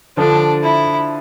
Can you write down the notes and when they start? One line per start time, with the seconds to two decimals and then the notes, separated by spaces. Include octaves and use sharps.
0.17 D3 F3 D4
0.63 E4